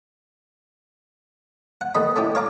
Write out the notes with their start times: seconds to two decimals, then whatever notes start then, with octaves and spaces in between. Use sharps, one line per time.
1.81 F#5
1.95 D#2 A3 D#5 B5
2.16 A3 C#4 E4 G4
2.35 C#5 F5 A#5 D6